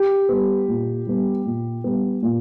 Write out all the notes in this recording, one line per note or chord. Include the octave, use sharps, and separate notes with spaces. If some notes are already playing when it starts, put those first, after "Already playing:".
Already playing: G4
G3 B3
A#2
G3 B3
A#2
G3 B3
A#2